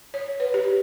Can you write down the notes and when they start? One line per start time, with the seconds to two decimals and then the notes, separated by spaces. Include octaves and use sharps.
0.14 C#5
0.40 B4
0.54 G4